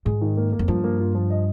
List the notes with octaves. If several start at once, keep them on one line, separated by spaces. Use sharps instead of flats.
G#2 G#4
D#3
A#3
A#3
F2
G2 F3
A#3
F4
F3
D#5